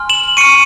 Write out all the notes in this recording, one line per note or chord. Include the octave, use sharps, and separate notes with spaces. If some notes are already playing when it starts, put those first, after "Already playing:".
Already playing: G#5 C6 F6
E7 F#7
C#6 F6 C#7 D#7